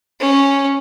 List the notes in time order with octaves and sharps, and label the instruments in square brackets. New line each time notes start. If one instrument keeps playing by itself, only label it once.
[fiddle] C#4